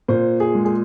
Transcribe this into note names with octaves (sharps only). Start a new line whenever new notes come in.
A#2 C5
G#4
G#3
G#4